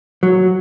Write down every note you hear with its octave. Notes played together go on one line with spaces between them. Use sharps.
F#3